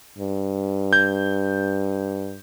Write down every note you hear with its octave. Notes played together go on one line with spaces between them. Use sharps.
G2
G6